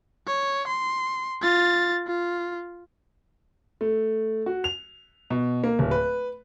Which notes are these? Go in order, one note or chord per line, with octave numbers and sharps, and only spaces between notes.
C#5
C6
F4 A6
F4
A3
F#4
F7
B2
A#3
D1
B4